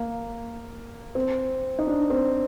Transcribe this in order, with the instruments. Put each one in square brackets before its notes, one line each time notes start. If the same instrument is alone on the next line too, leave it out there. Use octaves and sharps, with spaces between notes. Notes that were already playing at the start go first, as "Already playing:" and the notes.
Already playing: [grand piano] A#3
C4
D#4
D4
C4